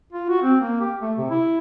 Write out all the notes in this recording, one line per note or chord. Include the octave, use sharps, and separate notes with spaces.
F4
F#4
C4
A#3
G4
A3
C3
E4